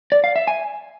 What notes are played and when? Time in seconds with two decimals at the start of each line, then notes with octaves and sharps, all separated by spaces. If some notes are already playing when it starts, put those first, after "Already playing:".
0.12 D5
0.24 F5
0.36 E5
0.47 G#5